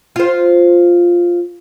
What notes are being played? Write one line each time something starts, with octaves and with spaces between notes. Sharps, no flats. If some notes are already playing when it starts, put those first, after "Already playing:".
F4 C5